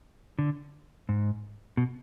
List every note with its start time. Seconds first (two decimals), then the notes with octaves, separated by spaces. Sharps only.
0.39 D3
1.09 G#2
1.77 B2